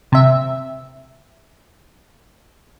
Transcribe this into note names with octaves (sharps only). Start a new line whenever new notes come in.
C3 E5